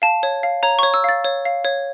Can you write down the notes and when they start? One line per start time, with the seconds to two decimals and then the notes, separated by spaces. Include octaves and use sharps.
0.02 F5 A5
0.23 C#5
0.43 F5
0.63 C#5 A#5
0.79 C#5 C#6
0.94 E6
1.04 F5 A6
1.24 C#5
1.45 F5
1.65 C#5